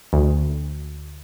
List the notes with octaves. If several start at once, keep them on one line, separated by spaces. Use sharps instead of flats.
D2